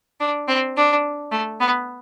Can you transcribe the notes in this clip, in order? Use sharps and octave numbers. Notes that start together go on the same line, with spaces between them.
D4
C4
D4
A3
B3